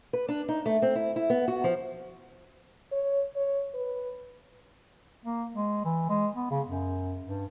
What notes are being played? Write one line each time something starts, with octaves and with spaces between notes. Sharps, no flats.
B4
D4
D#4
A3
C4
E4
E4
B3
F#4
F3
C#5
C#5
B4
A#3
G#3
E3
G#3
B3
C#3
F#2
G2